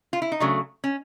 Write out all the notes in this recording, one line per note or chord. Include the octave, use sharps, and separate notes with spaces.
F4
E4
D#4
C#3 F#3 A3 D4
C#4